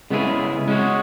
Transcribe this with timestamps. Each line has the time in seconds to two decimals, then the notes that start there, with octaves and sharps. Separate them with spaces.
0.10 C#3 G#3 B3 E4 G#4
0.68 G#3 C#4 F#4